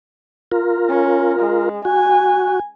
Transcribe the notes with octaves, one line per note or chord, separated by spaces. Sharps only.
F4 A#4
C#4
G#3
F#4 G#5